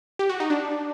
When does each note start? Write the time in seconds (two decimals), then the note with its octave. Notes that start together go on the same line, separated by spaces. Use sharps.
0.19 G4
0.29 F#4
0.40 D#4
0.50 D4